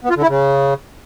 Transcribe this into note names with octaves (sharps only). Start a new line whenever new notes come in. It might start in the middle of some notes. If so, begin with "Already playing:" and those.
B3
F4
D3
E4
C#3